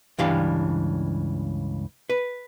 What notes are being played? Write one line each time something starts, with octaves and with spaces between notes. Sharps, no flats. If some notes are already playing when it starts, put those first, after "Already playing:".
C#2 G2 E3 D4 G4 F5
B4